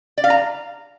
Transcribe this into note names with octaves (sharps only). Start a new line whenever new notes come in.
D5
F5
A#5